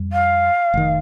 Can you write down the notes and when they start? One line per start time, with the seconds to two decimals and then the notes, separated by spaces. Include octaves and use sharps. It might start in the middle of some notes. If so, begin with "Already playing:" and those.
Already playing: F2 G3
0.12 F5
0.74 F1 D#3